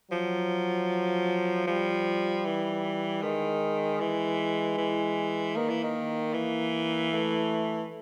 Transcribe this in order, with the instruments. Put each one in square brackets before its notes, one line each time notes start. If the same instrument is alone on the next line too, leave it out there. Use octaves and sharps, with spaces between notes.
[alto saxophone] F3 [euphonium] F#3
[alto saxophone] F3 [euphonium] G3
[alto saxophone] E3
[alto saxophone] D#3 [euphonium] G#3
[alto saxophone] E3
E3
[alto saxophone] D#3 [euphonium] A#3
[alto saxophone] E3
D#3
E3
[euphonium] A3